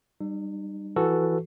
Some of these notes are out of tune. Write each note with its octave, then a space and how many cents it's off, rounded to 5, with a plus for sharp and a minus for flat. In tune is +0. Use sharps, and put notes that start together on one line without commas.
G3 +0 D#4 -40
E3 +10 F#4 +0 A4 +0